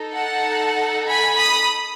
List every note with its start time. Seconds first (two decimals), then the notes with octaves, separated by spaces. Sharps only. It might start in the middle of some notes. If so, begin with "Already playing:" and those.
Already playing: D#4 A4
0.15 F#5 A5
1.07 G#5 B5
1.37 B5 D#6